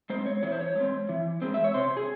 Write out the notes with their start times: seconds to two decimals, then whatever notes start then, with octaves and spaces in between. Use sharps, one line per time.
0.10 G#3 C5
0.14 C4
0.26 C#5
0.43 E3 C#5
0.52 C5
0.61 C#5
0.76 G#3 C4
1.09 E3
1.42 G#3 C4
1.54 E5
1.64 C#5
1.74 C3 C5
1.97 G#4